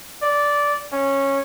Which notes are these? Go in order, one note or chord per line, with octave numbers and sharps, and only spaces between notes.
D5
C#4